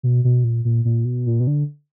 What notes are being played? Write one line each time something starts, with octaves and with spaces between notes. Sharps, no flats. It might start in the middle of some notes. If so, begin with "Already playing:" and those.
B2
B2
A#2
A#2
A#2
B2
A#2
B2
D3